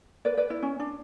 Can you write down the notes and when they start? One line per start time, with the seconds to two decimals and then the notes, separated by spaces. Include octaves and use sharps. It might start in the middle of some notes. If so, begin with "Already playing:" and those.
0.25 B4 D5
0.37 B4 D5
0.50 E4
0.62 C#4
0.79 D4